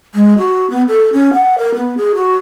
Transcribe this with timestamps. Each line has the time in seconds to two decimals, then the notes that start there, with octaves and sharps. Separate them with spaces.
0.15 G#3
0.38 F#4
0.70 B3
0.88 A4
1.13 C#4
1.33 F#5
1.58 A#4
1.74 B3
1.97 G#4
2.15 F#4